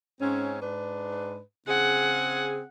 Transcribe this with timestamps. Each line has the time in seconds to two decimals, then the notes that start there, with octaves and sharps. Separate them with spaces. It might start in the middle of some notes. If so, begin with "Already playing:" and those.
0.20 G#2 C4 C#4
0.61 G#2 D4 B4
1.68 C#3 C4 G#4 F#5